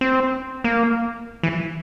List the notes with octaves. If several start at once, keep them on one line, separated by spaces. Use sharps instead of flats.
C4
A#3
E3